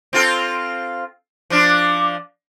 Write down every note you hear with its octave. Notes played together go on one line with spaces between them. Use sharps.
C4 F4 A4
F3 D4